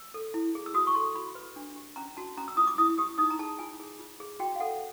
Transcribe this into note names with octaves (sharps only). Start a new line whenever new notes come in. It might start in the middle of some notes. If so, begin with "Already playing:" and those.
Already playing: E6
A4
E4
G#4
E6
F#4 D#6
C#6
A4 C6
F#4 B5
B4
D4
G4
C#4 A#5
F#4 A5
C#4 A#5
E6
F4 D#6
D6
E4 D#6
G4 D#6
D#4 D#6
A#5
G#4 A5
F4 G#5
G#4
F4
G#4
F#4 G5
F5
A4 F#5